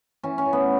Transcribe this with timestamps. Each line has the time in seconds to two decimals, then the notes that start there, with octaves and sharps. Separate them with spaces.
0.23 E3 C#4
0.38 C#4
0.46 A2
0.53 B3